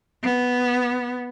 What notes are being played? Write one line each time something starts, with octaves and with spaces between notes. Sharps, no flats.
B3